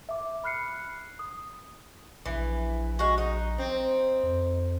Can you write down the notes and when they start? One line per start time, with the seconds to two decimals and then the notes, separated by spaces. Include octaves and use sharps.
0.09 E5 D6
0.44 B5 F6 F#6 C7 C#7
1.19 D#6
2.26 A#1 E3
2.99 G#3 F#4
3.18 D#4
3.58 C4
4.23 F2